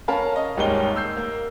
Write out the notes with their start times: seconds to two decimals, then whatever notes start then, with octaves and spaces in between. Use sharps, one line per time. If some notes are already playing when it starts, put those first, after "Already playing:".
0.08 C#4 A#4 F5 A5 B5
0.36 D#5
0.57 G#1 D#2 G3 G#3 C#5 G7
0.96 E6 G6 C7
1.17 A#3